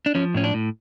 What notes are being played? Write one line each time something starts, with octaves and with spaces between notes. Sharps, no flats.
D4
F3 C#4
A2 C#4
D4
A2